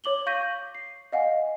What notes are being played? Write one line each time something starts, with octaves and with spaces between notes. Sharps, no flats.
C#5 D6 F#7 G7
F5 C#6 G6 A#6 B6 D#7
C7
D#5 F5 F#5 G#5